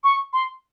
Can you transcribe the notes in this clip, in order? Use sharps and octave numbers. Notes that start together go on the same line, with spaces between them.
C#6
C6